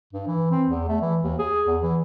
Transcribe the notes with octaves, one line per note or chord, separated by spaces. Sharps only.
G2
E3
C4
E2
A3
E3
D#2
G#4
E2
E3